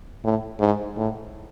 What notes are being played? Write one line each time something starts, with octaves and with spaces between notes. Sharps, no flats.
A2
G#2
A2